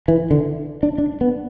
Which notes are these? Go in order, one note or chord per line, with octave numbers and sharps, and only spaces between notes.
E3
D3
D4
D4
B3